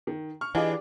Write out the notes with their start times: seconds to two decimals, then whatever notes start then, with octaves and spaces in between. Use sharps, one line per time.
0.07 D#3
0.41 C#6 F6
0.55 E3 D4 F4 G4 G#4 D5 D#5 G#5